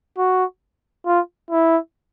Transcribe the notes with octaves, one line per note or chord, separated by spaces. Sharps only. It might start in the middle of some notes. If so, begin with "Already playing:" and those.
F#4
F4
E4